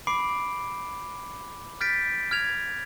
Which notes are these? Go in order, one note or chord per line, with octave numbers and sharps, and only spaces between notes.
B5 D6 C7 D7
F6 G6 A6 B6 D7
F6 G#6 F7